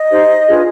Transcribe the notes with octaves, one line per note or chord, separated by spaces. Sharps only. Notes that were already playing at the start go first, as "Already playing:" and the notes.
Already playing: D#5
D#4 G4 C5
D4 F4 G#4 B4